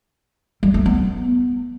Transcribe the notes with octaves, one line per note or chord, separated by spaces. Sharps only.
G3
A3
B3